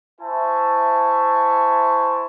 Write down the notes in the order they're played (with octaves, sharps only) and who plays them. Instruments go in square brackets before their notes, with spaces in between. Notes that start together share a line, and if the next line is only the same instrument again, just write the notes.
[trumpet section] E4 C5 E5 G#5 A5 C#6